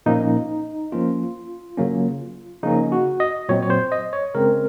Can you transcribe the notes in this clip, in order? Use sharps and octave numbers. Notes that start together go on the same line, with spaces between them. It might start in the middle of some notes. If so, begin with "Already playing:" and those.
A#2 F3 A#3 C#4 D#4
F3 A#3 C#4 F4
C#3 F#3 A#3 C#4
C#3 F3 A#3 C#4 D#4
F#4
D#5
A#2 F#3 C4 C#5
C#5
C5
D#5
C#5
C#3 G#3 C4 A#4